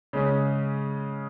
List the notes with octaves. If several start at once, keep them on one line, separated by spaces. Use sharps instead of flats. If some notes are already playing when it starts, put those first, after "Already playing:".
C#3 G#3 C#4